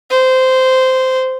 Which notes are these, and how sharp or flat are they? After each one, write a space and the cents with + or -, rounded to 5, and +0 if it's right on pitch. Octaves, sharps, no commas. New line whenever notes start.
C5 -15